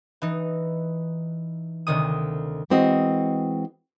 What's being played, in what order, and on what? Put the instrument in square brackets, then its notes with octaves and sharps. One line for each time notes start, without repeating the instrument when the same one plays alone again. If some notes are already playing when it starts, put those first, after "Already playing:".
[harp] E3 D#4
D2 C3 D#3 D#6
[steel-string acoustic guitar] E3 G#3 C4 F#4 D#5